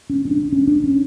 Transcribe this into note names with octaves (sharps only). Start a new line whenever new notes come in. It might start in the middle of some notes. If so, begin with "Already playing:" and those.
C#4
C#4
D4
C#4
D4
C#4